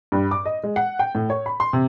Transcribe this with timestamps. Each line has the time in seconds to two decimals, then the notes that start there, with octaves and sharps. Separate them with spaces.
0.12 G2
0.31 D6
0.46 D#5
0.64 G#3
0.76 F#5
0.99 G5
1.15 A2
1.30 C#5
1.46 B5
1.60 C6
1.73 C3